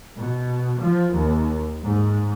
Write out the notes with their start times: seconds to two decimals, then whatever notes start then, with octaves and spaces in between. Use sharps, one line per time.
0.17 B2
0.81 F3
1.12 D#2
1.82 G#2